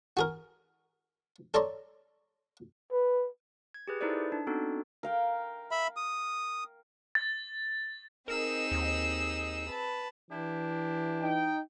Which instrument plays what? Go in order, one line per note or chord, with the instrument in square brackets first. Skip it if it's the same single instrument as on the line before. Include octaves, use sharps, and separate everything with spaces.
[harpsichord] F#4 G#4 A#4
A4 C#5 D5 A#5 C6
[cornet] B4
[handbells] G#6
G4 G#4 B4
D#4 E4 A4 B4 C5 D5
D4
B3 C4 D4 D#4 F#4 A4
[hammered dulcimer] A#4 F5 G5
[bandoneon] E5 B5
D#6
[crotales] A6
[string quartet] C4 D#4 D#5 [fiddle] G#4 E6 [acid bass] A#4
[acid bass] D#2
[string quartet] B4 A5
[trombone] E3 [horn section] D4 E4 G4
[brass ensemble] D#4 G5